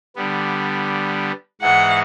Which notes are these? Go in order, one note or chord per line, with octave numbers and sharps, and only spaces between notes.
D3 G3 B3
G#2 E3 G#3 F#5